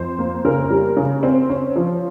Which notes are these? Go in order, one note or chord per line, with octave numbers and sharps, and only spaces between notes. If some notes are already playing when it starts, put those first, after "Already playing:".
Already playing: F2 C5
A#3
C#3 A#4
G3
C#3
C4
C#4
F3